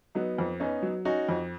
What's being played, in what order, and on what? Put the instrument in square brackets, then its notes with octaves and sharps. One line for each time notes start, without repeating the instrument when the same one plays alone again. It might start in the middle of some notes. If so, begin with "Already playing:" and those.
[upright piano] F#3 [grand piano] B3 D#4
[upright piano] F2
[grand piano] B3 D#4 [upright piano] C#4
[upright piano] F#3
[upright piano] C#4 [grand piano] D#4 F#4
[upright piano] F2